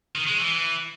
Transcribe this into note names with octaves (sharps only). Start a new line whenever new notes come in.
D#3
G#3
E3